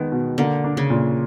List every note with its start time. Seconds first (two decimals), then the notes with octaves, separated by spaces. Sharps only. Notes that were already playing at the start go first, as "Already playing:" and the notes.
Already playing: D#3 G#3 B3
0.12 B2
0.38 D3 A#3
0.64 D4
0.77 C#3
0.90 A#2